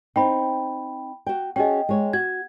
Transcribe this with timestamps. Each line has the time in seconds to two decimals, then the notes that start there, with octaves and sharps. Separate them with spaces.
0.16 C4 D#4 G5 B5
1.26 F#4 G5
1.56 C#4 F#4 G#4 D#5 G5
1.89 G#3 C#5
2.13 F#4 G#6